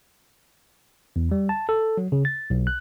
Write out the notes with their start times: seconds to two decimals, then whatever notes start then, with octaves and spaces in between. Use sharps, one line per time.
1.16 E2
1.31 G3
1.49 A5
1.69 A4
1.97 F#3
2.12 C#3
2.25 A6
2.50 B1
2.67 F#6